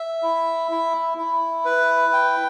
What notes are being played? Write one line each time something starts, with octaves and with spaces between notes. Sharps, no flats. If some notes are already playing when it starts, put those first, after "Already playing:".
Already playing: E5
E4
E4
E4
B4
G5